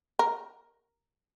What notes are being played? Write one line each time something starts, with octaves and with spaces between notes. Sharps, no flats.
A#4